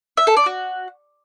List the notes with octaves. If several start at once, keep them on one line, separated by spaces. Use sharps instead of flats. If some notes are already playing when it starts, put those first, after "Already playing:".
E5
A4
D5
F#4